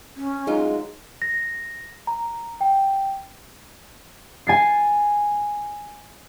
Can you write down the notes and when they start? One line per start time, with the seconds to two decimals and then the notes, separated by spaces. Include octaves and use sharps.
0.16 C#4
0.47 F#3 G#3 D#4 F4
1.22 A#6
2.07 A#5
2.61 G5
4.47 G#5 A6 C7